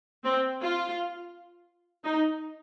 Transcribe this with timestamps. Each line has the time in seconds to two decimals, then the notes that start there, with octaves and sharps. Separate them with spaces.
0.24 C4
0.60 F4
2.04 D#4